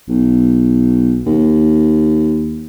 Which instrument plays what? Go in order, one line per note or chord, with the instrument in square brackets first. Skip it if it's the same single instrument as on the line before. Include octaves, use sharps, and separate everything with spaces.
[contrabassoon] B1
D#2